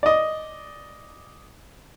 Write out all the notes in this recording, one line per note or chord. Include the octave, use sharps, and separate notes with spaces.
D5 D#5